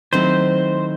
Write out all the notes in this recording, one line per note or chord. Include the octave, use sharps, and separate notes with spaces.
D#3 F#3 A3 C4 E4 C5